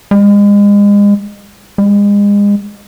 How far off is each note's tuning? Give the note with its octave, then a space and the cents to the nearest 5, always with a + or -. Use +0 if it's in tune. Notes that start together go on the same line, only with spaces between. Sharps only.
G#3 -35
G#3 -35